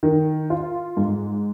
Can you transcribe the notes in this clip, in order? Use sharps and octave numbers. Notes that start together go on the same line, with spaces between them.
D#3
F4
G#2